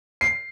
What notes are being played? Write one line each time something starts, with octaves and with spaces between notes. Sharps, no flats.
C7